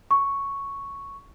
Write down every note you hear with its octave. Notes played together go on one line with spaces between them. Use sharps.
C#6